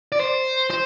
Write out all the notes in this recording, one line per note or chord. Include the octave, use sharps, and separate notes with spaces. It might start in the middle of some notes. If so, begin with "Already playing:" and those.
D5
C5
C5